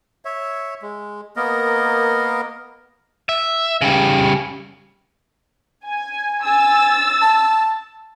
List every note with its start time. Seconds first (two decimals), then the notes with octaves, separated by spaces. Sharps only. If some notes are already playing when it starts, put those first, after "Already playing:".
0.25 C#5 E5
0.82 G#3
1.36 A#3 B3 A#4 D#5
3.29 E5
3.81 C#3 G3
5.87 G#5
6.46 G#5 E6 A6
7.22 A5